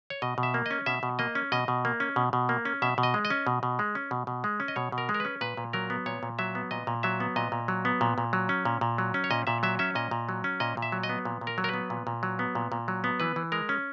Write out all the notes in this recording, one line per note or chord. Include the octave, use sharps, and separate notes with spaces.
C#5
B2 D#5
B2
E5
A#3
C#4 D#5
B2 E5
B2
A#3 D#5
C#4
B2 D#5
B2
A#3
C#4
B2
B2
A#3
C#4
B2 E5
B2
D#5
G#3
D#5
C#4
B2
B2
G#3
C#4
B2
B2
G#3
C#4
D#5
B2 C#5
B2
A#4
G#3
A#4
C#4 B4
A#2 B4
A#2
F#3 A#4
B3
A#2 C#5
A#2
F#3 E5
B3
A#2 D#5
A#2
F#3 E5
B3
A#2 D#5
A#2
F#3
B3
A#2
A#2
F#3
C#4
A#2
A#2
F#3
C#4
C#5
A#2 D#5
A#2 E5
F#3 E5
C#4 E5
A#2 D#5
A#2
F#3
C#4
A#2 D#5
A#2
E5
F#3
D#5
B3
A#2
A#2
A#4
F#3
A#4
B3 B4
A#2
A#2
F#3
B3
A#2
A#2
F#3
B3
E3 B4
E3
G#3 A#4
C#4